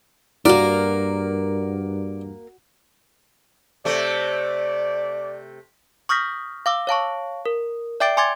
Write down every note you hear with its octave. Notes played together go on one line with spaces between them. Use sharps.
G2 A#3 F#4 A#4 D5
C3 A3 D5
C#6 D#6 F6 G6 A#6 B6
F5 D6 E6
C#5 F5 A5 C#6
A#4
D5 E5 G5 D6 A6 D7
G#5 C6 D6 G#6 A6